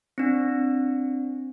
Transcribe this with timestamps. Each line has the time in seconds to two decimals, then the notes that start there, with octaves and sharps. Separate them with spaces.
0.18 C4 D4